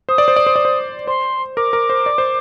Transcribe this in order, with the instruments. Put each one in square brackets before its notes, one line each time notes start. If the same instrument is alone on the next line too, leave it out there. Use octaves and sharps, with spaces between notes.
[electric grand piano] C5 [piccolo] D#6
[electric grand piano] D5
C5
D5
C5
D5
C5
[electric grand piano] C5 [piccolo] C6
[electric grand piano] A#4 [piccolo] D6
[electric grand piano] A#4
C5
D5
C5